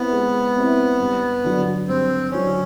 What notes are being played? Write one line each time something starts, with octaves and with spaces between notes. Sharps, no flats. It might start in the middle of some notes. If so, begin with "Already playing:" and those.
Already playing: B3 C4 E4
G#3
C4 E4
G2
D3 F#3
G2 C4
D3 F#3 C#4